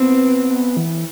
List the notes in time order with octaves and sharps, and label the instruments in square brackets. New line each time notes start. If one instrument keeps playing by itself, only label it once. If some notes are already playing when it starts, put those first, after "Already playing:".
Already playing: [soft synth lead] B3 [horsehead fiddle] C4
[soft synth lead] B3
E3